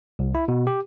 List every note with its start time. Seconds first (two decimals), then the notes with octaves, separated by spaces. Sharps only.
0.19 C2
0.35 E4
0.48 B2
0.67 G4